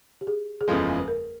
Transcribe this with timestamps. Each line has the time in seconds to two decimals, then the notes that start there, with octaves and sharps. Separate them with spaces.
0.21 G4
0.27 G#4
0.61 G#4
0.68 F#1 E2 C#3 F3 G#3 A4
0.99 B4
1.08 A#4